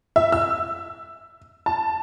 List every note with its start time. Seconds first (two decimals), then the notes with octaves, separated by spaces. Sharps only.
0.16 E5
0.32 E6
1.66 A5